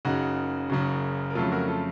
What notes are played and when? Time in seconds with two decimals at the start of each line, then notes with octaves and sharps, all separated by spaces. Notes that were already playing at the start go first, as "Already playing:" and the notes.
0.05 F#1 F#2 C#3 D#4 F#4
0.70 F#1 F#2 C#3
1.30 A#4
1.35 F2 C#3 F#3 A3 F4 A4
1.51 F#4 A#4
1.68 F4 A4